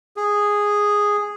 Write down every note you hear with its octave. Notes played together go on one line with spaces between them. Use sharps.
G#4